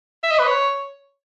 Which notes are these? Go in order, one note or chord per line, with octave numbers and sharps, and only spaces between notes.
E5
D#5
B4
C#5